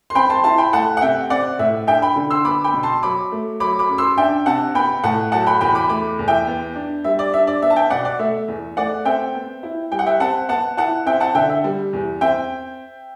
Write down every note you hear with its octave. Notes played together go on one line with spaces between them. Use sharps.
C6
C4 G5 B5
A5 C6
E4 A5 C6
G5 B5
A3 F#5 A5
F#5
C3 E5 G5
C4 D5 F#5
A2 E5
D4 E5 G5
G5 B5
D3
C6 E6
B3 B5 D6
G5 B5
B2
A5 C6
F#3 B5 D6
A3
F#3 B5 D6
B5 D6
F#2
C6 E6
D4 E5 G5
C3 F#5 A5
B3 G5 B5
A2 F#5 A5
F#3 F#5 A5
G5 B5
E2 G5 B5
B5 D6
A3 B5 D6
E2
E5 G5
B3
D4
G3 E5
D5
D4 E5
D5
B3 E5
A5
E5 G5
B2 D5 F#5
D5
A3 E5
E2
A3 D5 F#5
C4 E5 G5
B3
E4
G3 G5
F#5
E5 G5
C4 F#5 A5
B3 F#5 A5
E4 F#5 A5
C4 E5 G5
F#5 A5
D3 E5 G5
E5
G3
E2
C4 E5 G5